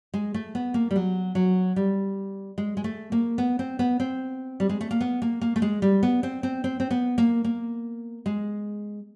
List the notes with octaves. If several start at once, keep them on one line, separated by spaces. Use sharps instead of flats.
G#3
A3
B3
A#3
G3
F#3
F#3
G3
G#3
G#3
A3
A#3
B3
C4
B3
C4
G3
G#3
A3
A#3
B3
A#3
A#3
A3
G#3
G3
B3
C4
C4
C4
C4
B3
A#3
A#3
G#3